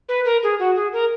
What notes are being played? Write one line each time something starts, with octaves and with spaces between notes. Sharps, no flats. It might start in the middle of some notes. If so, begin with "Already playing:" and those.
B4
A#4
G#4
F#4
G#4
A#4